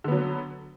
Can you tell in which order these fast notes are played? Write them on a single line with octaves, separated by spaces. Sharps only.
D3 B3 F#3